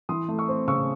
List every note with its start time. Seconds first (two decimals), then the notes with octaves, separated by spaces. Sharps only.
0.09 E3 C6 D#6
0.28 A3
0.38 C#6 E6
0.48 C4
0.68 C#3 C#6 E6